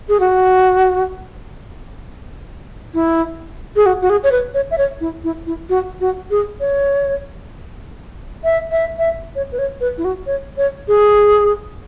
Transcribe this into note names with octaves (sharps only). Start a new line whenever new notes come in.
G#4
F#4
E4
G#4
F#4
F#4
G#4
C#5
B4
C#5
E5
C#5
E4
E4
E4
F#4
F#4
G#4
C#5
E5
E5
E5
C#5
B4
C#5
B4
E4
F#4
C#5
C#5
G#4